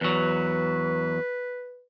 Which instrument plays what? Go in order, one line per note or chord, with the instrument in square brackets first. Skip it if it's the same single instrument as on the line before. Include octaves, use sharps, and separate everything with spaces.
[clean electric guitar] E2 F#3 [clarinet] B4